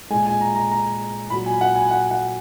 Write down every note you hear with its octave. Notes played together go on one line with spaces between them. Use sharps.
A#2 G#3 G#5
G#5
A#5
A#5
A#5
A#2 F#3 B5
G#5
F#5
G#5
F#5
F#5